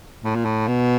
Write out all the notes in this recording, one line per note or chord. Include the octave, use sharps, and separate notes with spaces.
A2
A#2
A2
B2